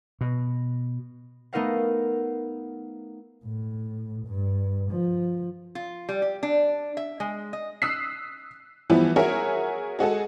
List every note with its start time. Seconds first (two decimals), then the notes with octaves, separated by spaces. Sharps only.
0.21 B2
1.53 A3 B3 D#4 A#4 F5 F#5
3.45 A2
4.26 G2
4.91 F3
5.75 F4
6.09 G3
6.22 G4
6.43 D4
6.97 E5
7.20 G#3
7.53 D#5
7.82 D#6 E6 F#6 B6 C7
8.90 E3 F3 G3 B3 E4
9.16 F#4 G#4 A#4 C#5 E5
9.99 G#3 F#4 G#4 A4